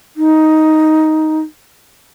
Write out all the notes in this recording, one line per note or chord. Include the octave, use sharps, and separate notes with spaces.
D#4